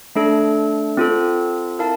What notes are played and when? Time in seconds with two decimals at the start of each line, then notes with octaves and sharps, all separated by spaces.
0.15 A3 D4 A4
0.97 C4 F4 A4
1.79 E4 A#4 F5 A5